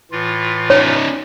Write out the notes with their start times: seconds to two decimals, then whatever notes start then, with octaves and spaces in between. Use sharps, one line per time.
0.11 A2 E3 F4
0.70 C#4 D#4 C#5